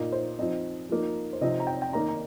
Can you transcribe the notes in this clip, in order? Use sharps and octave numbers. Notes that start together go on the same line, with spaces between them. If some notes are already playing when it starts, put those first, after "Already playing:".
Already playing: A#2 A#3 D#4 D#5
C5
F3 C4 D#4 D#5
F3 A#3 D#4
C5
C3 F3 C4 D#4 D#5
A#5
G5
G5
D#3 A#3 D#4 A#5
A#5